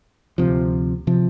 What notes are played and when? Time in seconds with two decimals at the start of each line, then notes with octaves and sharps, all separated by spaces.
0.38 D2 C3 F3
1.07 C3 F3